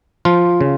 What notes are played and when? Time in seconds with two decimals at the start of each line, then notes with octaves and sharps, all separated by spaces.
0.25 F3 F4
0.61 C#3